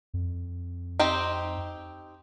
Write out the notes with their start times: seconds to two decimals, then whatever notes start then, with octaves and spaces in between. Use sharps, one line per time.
0.14 F2
1.00 C4 D#4 G4